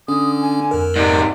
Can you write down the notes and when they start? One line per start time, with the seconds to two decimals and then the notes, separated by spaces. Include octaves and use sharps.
0.08 D3 C#4 D#6
0.41 G#5
0.71 F2 A#4
0.96 G#2 C3 D5